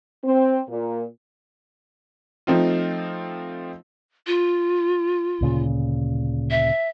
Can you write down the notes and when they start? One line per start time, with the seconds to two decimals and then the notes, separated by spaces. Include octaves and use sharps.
0.24 C4
0.69 A#2
2.47 F3 A3 C4 D#4 F4
4.27 F4
5.41 D2 A#2 C#3
6.51 E5